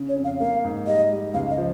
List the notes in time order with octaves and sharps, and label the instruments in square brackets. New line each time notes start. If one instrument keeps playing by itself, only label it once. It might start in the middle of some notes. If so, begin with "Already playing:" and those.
Already playing: [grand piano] C#3
[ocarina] C#5
[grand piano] F2
[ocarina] F5
[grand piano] A#3 [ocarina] F5
[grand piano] G#2
[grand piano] G3 [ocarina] D#5
[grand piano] G3
[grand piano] C#2 [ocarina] F5
[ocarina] D#5
[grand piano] F3